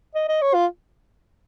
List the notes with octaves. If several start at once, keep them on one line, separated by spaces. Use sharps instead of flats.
D#5
D#5
C#5
F4